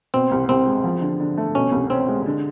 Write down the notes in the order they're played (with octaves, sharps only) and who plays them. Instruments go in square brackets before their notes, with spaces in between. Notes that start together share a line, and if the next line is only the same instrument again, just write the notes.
[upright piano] B2 [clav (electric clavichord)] C4
[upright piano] C2
[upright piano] C2 [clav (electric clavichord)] C4
[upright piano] G#3
F3
D3
D3
A3
[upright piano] B2 [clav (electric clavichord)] C#4
[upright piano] C2
[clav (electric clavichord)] C4 [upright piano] C#4
[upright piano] G#3
D3